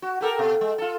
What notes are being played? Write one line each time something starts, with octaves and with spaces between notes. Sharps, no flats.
F#4
G4 A4 A#4
B2
G#3
F4 A4